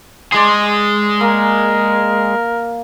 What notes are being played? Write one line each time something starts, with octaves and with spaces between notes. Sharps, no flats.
G#3 G#4 D5 C6
A#3 A#4